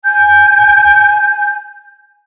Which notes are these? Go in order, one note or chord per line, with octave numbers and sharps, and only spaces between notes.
G#5 G6